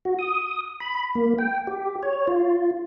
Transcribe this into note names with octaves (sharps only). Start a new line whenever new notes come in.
F#4
D#6
B5
A#3
G5
G4
C#5
F4